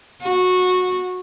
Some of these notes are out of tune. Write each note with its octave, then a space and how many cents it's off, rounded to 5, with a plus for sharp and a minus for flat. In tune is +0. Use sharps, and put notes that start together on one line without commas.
F#4 -15